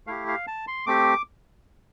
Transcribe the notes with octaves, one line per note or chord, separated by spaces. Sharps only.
A3 E4 G4 F5
F5
A5
C6
A3 C4 G4 D6